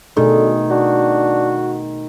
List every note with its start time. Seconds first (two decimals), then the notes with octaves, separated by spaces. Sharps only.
0.17 B2 D3 D#3 A3 G#4
0.71 D4 F#4